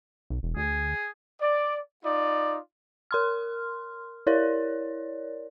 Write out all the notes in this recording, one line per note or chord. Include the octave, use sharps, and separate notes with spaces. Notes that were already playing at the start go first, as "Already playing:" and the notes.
B1
E1
D2 G#4
D5
D#4 F4 D5
A#4 C6 F6
E4 A#4 C#5 D5